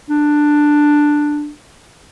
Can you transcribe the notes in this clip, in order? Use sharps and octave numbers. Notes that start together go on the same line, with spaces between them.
D4